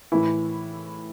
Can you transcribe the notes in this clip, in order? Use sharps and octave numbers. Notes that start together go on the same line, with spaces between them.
A2 E3 E4